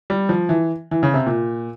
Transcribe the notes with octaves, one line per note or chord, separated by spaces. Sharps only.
G3
F3
E3
E3
C#3
C3
A#2